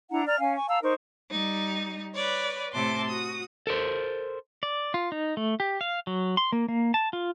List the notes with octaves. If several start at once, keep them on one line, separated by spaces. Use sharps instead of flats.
D4 E4 F#5 A#5
D5 A#5 F6
C#4 F5 G#5
G#5 C#6
F5 A5 A#5 E6
D#4 A#4 C5 C#6
G3 D#4
B4 C#5 D5
A2 C3 E5 A5 C6 D6
F#4 D#6
A4 A#4 C5
D5
F4
D#4
A3
G4
F5
F#3
C6
A#3
A#3
A5
F4